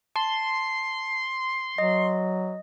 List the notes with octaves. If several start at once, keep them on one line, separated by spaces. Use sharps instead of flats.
A5 C6
F#3 D#5